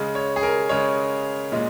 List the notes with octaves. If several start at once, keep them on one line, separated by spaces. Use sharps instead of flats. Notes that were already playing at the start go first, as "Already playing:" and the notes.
Already playing: C#3 G#3
C#5
G#4
A#4
C#3 G#3 C#5
A#2 G#3